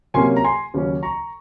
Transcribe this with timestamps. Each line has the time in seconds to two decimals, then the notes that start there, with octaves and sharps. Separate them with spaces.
0.14 C3 F#3 A#3 C#4 G#5 C6
0.36 A#5
0.44 G#5 C6
0.74 D#2 C#3 F#3 C#4
1.03 A#5 C#6